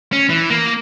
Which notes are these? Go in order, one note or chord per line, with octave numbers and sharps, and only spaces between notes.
C#4
E3
A#3